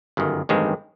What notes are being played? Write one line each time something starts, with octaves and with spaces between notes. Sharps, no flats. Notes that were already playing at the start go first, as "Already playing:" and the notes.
G1 F#2 D#3
A1 G2 D#3 G#3 C4